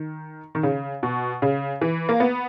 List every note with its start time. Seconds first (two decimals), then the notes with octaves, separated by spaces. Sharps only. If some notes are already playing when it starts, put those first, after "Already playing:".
Already playing: D#3
0.55 D#3
0.63 C#3
1.03 B2
1.42 C#3
1.81 E3
2.09 A#3
2.20 B3